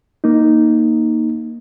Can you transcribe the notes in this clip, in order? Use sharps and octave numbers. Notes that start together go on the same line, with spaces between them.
A#3 D#4